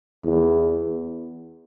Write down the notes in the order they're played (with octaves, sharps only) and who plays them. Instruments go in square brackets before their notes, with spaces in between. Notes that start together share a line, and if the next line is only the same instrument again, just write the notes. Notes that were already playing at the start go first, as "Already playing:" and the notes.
[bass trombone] E2